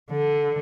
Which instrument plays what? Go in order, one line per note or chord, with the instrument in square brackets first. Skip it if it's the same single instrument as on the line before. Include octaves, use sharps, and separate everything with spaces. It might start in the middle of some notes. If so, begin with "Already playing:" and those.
[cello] D3